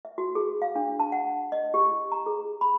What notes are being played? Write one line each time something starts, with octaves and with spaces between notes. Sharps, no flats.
E5
F#4
G#4
F5
D4
A5
F#5
D#5
G4
A#5
G#4
B5